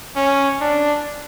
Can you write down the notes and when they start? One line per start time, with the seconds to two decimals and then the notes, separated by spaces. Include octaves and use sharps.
0.16 C#4
0.61 D4